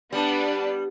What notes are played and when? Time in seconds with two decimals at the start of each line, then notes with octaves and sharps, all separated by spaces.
0.13 G3 B3 D4 B4